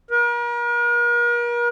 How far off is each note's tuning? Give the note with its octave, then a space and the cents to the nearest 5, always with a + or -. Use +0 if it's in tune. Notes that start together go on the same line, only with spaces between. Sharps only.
A#4 +40